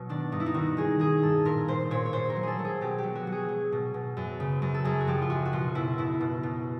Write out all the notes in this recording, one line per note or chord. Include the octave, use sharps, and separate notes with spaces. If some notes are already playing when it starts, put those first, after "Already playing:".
Already playing: B2 F#3 F#4
D#3 D4
G2 D#4
E4
D#4
D#3 F#4
D#3 G#4
D#3 G#4
G2 A4
A#2 A#4
A#2 C5
A#2 C#5
C#5
A#2 C5
A#4
F#3
G#4 A4
F#3
G#4
B2 G4
F#3 G4
F#4
F#3
G#4
F#3
B2
B2
F#2
C#3
F#2
A4
F#2 G#4
F#4
F3 G4
F4
F#2 F#4
F#4
B2 F4
B2 E4
B2 E4
B2
B2